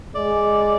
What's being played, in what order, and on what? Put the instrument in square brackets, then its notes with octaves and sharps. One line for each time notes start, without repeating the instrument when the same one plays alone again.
[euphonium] G#3 [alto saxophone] D5